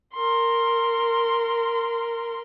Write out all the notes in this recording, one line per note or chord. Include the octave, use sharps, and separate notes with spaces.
A#4 C6